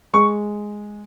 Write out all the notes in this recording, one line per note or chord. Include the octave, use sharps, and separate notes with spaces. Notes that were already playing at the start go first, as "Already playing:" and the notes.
G#3 C#6